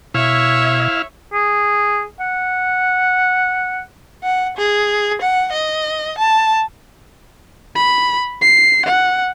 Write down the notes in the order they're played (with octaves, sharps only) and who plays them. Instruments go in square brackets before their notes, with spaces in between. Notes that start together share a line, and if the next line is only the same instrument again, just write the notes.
[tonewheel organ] B2 [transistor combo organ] E4 F5 [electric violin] C#5 E5
[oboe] G#4
F#5
[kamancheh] F#5
G#4
F#5
D#5
A5
[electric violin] B5
C7
F#5